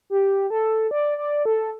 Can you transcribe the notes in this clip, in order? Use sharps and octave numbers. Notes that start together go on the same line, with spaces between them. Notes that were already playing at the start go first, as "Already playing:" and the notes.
G4
A4
D5
D5
A4